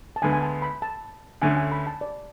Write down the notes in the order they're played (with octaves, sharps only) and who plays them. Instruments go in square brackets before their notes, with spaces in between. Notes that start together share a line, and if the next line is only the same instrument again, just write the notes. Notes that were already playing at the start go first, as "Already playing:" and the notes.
[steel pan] A5
[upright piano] D2 D3 G#3 B3 [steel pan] G#5
[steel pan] G#5
A5
B5
A5
[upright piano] D2 D3 A3 C#4 [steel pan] G#5
[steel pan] G#5
B5
A5
D5